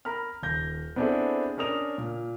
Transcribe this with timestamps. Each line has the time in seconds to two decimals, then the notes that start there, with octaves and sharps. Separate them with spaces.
0.05 A#4 A#5 B5 F6
0.43 D#1 G6 A#6
0.96 B3 C4 D4 E4 G#4 A4
1.57 C#4 D4 A#4 D#6 F7
1.98 A#2